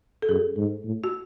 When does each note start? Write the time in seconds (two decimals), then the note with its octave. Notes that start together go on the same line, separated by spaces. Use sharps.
0.22 A4
0.29 F#2 G#4
0.57 G#2
0.85 A2
1.04 F#4